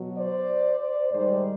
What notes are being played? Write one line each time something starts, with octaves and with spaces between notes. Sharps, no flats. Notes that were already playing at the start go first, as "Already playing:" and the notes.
Already playing: B2 F#3
C5 D5
C5 D5
G#2 D#3 G3 C5 D5